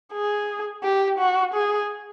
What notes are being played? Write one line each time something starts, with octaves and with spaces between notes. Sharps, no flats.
G#4
G4
F#4
G#4